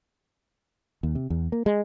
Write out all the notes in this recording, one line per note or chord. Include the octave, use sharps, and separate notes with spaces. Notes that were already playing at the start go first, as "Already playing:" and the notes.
D#2
C3
E2
A#3
G#3